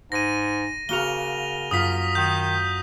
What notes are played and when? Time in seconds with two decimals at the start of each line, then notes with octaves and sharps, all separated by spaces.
0.12 G#2 A#6 D#7
0.89 C#3 A#3 F#4 A#4 F7 G7
1.71 F#2 F4 D#6 B6
2.15 D#3 G6